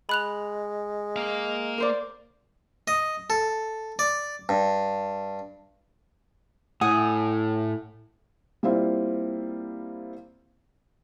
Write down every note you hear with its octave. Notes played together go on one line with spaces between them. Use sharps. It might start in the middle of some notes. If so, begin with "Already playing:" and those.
G#3 B5 F#6 F7
A#3 F5
A#4 C5 D5
D#5
A4
D5
G2
A2 F#5 G#5 D#6
G3 A#3 C4 E4 F4